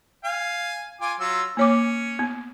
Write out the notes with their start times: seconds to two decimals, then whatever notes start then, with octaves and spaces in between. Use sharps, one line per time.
0.24 F5 G#5
1.01 F4 G#5 D6
1.20 F#3 F4 E6
1.57 A#3 C#4 C#5 D6
2.19 B3